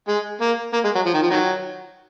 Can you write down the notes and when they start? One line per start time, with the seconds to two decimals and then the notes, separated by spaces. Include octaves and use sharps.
0.08 G#3
0.41 A#3
0.73 A#3
0.84 G#3
0.95 F#3
1.06 F3
1.14 D#3
1.22 F3
1.31 D#3 F#3